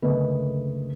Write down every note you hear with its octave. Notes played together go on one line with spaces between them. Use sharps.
F#1 D2 A3 A#4 B4 D#5